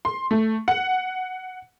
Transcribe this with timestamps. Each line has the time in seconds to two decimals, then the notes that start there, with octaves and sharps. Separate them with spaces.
0.05 C6
0.31 A3
0.68 F#5